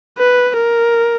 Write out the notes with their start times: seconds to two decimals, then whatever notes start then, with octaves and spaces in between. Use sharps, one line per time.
0.18 B4
0.57 A#4